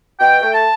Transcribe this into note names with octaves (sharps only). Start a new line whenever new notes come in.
B2 G5
A3
A5